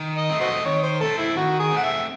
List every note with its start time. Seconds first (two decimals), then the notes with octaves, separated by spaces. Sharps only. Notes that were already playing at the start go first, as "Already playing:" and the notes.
Already playing: D#3
0.18 D#5
0.30 A3 C4
0.41 F#4 C5 D#5
0.65 D#3 C#5
0.83 C5
1.00 A3 C4 A4
1.18 E4
1.35 D#3 F#4
1.60 G#4
1.71 A3 C4
1.77 F#5
1.83 E5